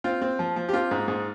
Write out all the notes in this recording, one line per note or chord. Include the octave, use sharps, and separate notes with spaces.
C4 F4
C4
F3
F3
G4
C4 F4
G#2
G#2